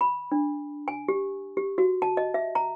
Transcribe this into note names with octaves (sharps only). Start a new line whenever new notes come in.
B5
D4
G#5
G4
G4
F#4
A5
D#5
E5
A#5